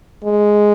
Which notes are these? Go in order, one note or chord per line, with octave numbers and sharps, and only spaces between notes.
G#3